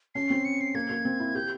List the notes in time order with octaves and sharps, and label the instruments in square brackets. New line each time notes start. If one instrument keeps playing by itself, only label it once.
[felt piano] C#4 [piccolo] C7
[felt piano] C4
[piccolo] C#7
C7
[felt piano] A#3 [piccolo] G#6
[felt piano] A#3
C4
E4
[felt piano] G4 [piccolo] G6